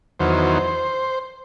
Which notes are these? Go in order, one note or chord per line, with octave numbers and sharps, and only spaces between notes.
E2 D#3 F#3 C5